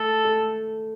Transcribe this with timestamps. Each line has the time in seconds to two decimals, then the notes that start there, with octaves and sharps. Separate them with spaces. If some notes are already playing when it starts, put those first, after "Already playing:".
Already playing: A3 A4
0.25 A3